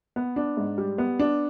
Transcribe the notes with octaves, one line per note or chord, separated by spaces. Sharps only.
B3
D4
G#2
G3
B3
D4